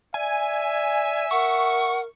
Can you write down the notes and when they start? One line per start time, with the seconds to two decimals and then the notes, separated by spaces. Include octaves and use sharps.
0.14 D5 E5 G#5
1.31 A#4 F#5 C#6